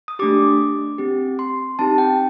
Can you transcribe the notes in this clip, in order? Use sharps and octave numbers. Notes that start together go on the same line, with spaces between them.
D#6
A3 D4 G4 D6
C4 G4
C6
C4 D#4 G4 A5
G5